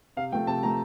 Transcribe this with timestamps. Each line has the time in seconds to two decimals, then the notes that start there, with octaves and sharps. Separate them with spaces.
0.17 C3 F5
0.32 F3 A3 G5
0.47 C3 A5
0.63 F3 A3 A#5